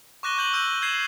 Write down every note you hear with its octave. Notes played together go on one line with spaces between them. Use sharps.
C#6 D6 F#6 A#6 D#7 G7
C#6 F#6 G6 A#6 D#7 F#7
E6 G6 D#7
G6 G#6 C7 D#7 E7 F#7